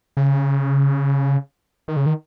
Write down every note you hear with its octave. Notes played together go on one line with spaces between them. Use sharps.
C#3
D#3
C#3
D#3